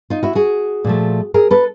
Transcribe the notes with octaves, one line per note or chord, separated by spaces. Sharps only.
D#4 F4
E4 F#4
F#4 G#4
A#2 F3 A3
G#4 A#4
A4 B4